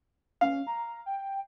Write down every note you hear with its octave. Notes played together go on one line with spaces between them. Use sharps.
C#4 F5
A#5
G5